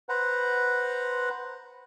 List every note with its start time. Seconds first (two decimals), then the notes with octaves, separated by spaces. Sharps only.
0.09 B4 C5 F#5 A#5